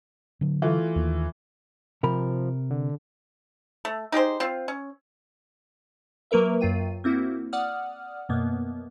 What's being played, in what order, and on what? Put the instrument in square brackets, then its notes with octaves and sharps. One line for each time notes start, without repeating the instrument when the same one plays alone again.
[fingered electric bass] D3 F#3
[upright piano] E3 A3 F4
[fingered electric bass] D#2 D#3 A#3
[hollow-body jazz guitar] C3 A#4 B5 [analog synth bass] F3
[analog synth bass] D3
[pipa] A3
D#4 G4 G#4 C5
C4 F4
C#4
[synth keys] F#3 A#3 A#4 B4 E5
F#2 F#3 F4 G5 D#7
A#3 C4 E4 F#4
D5 F#5 D#6 F6
F#2 B2 A#3 B3